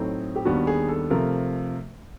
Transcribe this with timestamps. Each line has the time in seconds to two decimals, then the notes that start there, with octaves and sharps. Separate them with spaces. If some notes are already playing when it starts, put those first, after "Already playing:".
Already playing: A2 F#3 A3 C4 D#4
0.36 G4
0.45 D#2 D#3 G3 B3 D4 F#4
0.67 G#4
0.89 A4
1.10 C3 F3 A3 A#4